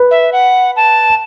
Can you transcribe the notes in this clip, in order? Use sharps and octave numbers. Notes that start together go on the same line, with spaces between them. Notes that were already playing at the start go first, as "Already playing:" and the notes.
Already playing: B4
E5
F#5
A5